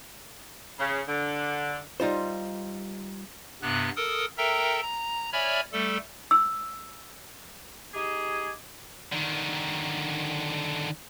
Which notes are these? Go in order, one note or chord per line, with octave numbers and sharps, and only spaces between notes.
C#3
D3
G3 D#4 F4 C5
G2 C3 B3 F#6
A4 A#4 D#6
A4 A#4 E5 G5 A#5
A#5
C#5 D5 E5 G#5 B5 F6
G3 A3 A4
E6
D#4 G4 G#4
D3 D#3